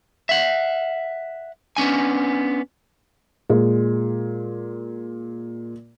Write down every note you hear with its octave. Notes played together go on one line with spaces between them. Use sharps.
E5 F#5
B3 C#4 D4 G#5
A#2 G#3